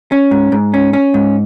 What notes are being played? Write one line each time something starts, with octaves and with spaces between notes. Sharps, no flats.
C#4
G#2
G#2
C#4
C#4
G#2